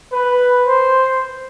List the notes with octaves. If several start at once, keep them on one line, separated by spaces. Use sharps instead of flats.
B4
C5